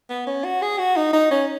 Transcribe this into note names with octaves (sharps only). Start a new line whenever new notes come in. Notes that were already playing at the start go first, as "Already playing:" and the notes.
B3
C#4
F#4
G#4
F#4
D#4
D#4
C#4